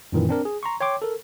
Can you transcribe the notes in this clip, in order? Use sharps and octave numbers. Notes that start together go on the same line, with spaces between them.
F#2 A#2 D#3 E3
C4 D4 A#4
G#4
A#5 C6 C#6
C#5 G5 C6 D6
A4 A#4